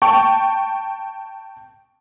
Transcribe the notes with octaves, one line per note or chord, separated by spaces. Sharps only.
G5 A5 C#6